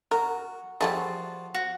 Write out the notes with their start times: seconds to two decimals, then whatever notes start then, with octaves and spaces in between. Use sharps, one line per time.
0.11 F#4 A#4
0.81 F3 G3 A3 F4 F#4 G#4 A5
1.54 F#4